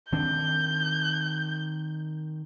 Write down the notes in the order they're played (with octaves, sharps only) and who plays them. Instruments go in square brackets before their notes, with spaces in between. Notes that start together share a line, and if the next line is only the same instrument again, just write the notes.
[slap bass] D#3 C4 D4 [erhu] G6